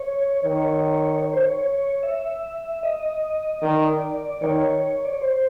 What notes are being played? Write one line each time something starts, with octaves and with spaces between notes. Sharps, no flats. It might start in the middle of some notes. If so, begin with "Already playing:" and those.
Already playing: C#5
D#3 C#5
C#5
C5
C#5
E5
D#5
D#3 D5
D#3 C#5
D5
C#5
C5